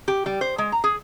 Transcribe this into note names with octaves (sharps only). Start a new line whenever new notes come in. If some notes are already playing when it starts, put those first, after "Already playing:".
G4
G3
C5
G#3
A#5
G#4